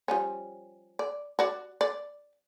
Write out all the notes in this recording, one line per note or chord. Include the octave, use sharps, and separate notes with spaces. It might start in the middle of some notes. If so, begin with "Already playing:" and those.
F3 G3 C#4
D5
F#4 D5
D5